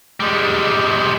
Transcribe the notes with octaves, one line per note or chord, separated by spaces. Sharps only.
G3 G#3